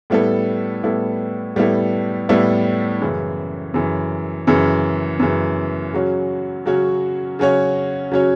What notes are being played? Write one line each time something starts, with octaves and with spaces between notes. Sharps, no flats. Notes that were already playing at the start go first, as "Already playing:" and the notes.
A2 G3 B3 E4 A4
A2 G3 B3 E4 A4
A2 G3 B3 E4 A4
A2 G3 B3 E4 A4
F#2 C#3 E3
F#2 C#3 E3
F#2 C#3 E3
F#2 C#3 E3
C#3 F#3 C#4 F#4 C#5
C#3 F#3 C#4 F#4 C#5
C#3 F#3 C#4 F#4 C#5
C#3 F#3 C#4 F#4 C#5